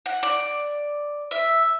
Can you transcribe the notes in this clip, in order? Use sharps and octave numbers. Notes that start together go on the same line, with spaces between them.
F#5
D5
E5